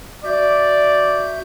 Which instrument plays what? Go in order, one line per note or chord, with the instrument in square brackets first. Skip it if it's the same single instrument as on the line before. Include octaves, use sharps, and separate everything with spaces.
[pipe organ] F#4 E5 G6 [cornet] D5